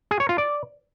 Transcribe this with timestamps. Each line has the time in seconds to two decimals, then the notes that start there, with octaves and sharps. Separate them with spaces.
0.11 G#4
0.20 C#5
0.29 F4
0.38 D5